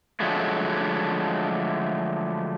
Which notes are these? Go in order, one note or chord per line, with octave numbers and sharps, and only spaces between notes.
D3 F3 F#3 G#3 A3